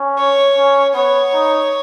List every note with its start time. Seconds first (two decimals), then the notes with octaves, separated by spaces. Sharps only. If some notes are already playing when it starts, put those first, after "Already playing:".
Already playing: C#4
0.18 C#5
0.56 C#4
0.94 B3 C#5
1.33 D#4